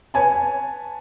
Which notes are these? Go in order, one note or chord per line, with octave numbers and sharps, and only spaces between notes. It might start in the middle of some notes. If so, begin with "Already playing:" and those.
B4 C#5 G#5 A5